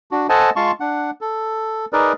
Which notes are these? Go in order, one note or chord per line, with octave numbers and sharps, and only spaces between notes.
D4 F#4
A4 C5 D#5 F#5 G#5 A5
G#3 F4 F5 A5 C6 C#6
D4 F#5
A4
D#4 G#4 A#4 B4 D5